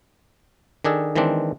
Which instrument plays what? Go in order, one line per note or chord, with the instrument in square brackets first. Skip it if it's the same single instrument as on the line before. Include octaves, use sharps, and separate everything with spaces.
[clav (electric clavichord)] D#3 D4 G#4 A4
D#3 E3 G#3 C4 D4